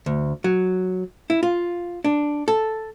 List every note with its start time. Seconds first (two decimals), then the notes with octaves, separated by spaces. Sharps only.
0.06 D2
0.44 F#3
1.30 E4
1.43 F4
2.04 D4
2.48 A4